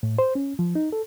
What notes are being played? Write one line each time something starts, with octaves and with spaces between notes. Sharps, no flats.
A2
C5
C#4
F3
D#4
A4